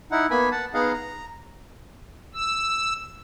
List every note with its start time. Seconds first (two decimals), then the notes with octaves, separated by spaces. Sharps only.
0.12 D#4 E4 F#5
0.31 A#3 B3 G#5 B5
0.52 F#5 A5
0.74 B3 D#4 G#4 D#5 F5 F#5
0.93 A#5
2.34 E6